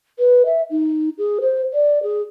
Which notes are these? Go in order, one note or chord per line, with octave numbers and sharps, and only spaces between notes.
B4
E5
D#4
G#4
C5
D5
G#4